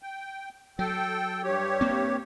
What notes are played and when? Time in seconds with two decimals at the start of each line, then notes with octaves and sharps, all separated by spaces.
0.02 G5
0.79 F#3 A4 G5
1.44 G2 G4 C#5
1.81 A#3 C4